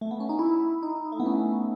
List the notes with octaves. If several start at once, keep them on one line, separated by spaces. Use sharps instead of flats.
A3
B3
C#4
D#4
E4
D#4
A3
B3
C#4